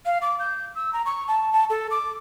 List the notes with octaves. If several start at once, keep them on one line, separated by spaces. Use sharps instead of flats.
F5
D6
G6
E6
A#5
C#6
A5
A5
A4
D6